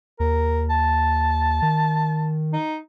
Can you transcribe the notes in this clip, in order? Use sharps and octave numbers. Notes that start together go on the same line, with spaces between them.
D#2 A#4
A5
D#3
D#4